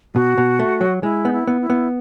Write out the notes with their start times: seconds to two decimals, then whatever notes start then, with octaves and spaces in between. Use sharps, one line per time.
0.15 B2 F#4
0.38 B2
0.59 A3
0.81 F#3
1.03 G#3 E4
1.25 B3 D#4
1.33 E4
1.47 B3
1.61 E4
1.70 B3